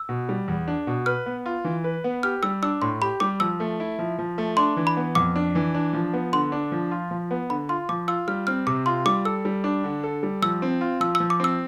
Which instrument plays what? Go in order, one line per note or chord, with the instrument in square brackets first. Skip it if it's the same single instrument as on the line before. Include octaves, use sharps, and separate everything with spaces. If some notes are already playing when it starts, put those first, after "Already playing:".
Already playing: [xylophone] E6
[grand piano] B2
G3
E2
D4
B2
[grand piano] B4 [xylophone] F6
[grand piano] B3
F4
E3
B4
B3
[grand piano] G4 [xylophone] F6
[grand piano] G3 [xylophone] E6
[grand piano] D4 [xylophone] E6
[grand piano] A2 [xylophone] C6
[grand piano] G4 [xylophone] B5
[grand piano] G3 [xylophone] D6
[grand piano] F3 [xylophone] E6
[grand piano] A3
E4
F3
F3
A3
[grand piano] D4 [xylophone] C6
[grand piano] E3
[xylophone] B5
[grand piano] B3
[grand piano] F2 [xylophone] D6
[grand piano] D4
E3
D4
F3
B3
[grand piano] D3 [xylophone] C6
[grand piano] D4
F3
F4
F3
B3
[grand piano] D3 [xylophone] B5
[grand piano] F4 [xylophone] C6
[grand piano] F3 [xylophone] D6
[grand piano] F4 [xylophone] E6
[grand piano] G3 [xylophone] F6
[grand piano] C4 [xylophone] F6
[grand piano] C3 [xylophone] D6
[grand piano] F4 [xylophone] C6
[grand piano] G3 [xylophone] D6
[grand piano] A4 [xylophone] E6
[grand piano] G3
D4
D3
A4
G3
[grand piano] F3 [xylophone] E6
[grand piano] C4
F4
[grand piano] F3 [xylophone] E6
[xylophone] E6
[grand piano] F3
[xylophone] D6
[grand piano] C4 [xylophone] E6